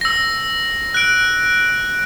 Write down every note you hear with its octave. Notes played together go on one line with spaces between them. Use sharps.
E6 A#6
F#6 D7